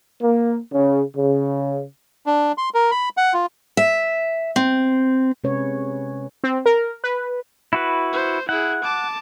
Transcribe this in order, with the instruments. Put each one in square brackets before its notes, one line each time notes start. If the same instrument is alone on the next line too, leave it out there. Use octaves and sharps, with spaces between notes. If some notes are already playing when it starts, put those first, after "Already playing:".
[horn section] A#3
C#3
C#3
[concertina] D4
C6
A#4
B5
F#5
F4
[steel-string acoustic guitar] E5
C4
[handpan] C3 G#3 C#4 B4 C#5
[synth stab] C4
A#4
B4
[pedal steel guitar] E4 F#4 B4
[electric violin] C5
[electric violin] E4 G#4 [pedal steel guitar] F#5
[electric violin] A5 D6